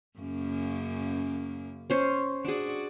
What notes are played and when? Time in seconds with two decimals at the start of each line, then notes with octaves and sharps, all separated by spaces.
0.19 F#2 C#3 A#3
1.90 C#4 C5 C#5
2.45 D4 F#4 G#4 D5